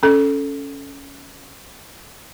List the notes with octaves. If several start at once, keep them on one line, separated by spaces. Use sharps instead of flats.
C#4 A4